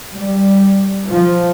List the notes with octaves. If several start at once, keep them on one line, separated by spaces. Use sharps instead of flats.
G3
F3